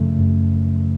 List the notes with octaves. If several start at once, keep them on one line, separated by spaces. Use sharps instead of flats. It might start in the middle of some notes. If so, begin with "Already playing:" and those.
Already playing: F#2 C#3 F3 A3
F#2